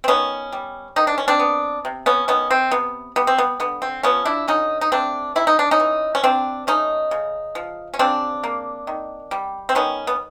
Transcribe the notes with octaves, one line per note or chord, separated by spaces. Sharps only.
C4
D#3 B3 C#4
G3
D#3 D#4
D4
C#4
C4 D4
B3
C3
B3 C#4
D#3 B3 C#4
C4
C3 B3
G3 B3
C4
B3
D3 B3
C4
F3 B3 C#4
D4 E4
D3 C#4 D#4
D#4
A3 C4 D4
C3 E4
D#4
D4
C#4 D#4
E3
C#4
C3 C4 D4
A3 C#4 D#4
C#3
F3
C#4
C#3 C4 D4
A#3
D#3
G3
C4
D#3 B3 C#4
B3